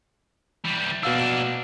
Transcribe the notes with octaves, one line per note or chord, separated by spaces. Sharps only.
E3 G3
B2 A#3 D4 F5 E6